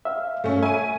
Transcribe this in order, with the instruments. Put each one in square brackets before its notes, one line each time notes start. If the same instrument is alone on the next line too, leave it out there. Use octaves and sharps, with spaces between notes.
[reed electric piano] E5 F5
[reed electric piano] G2 [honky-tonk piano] A3 C#4
[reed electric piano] E5 [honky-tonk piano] G#5 D#7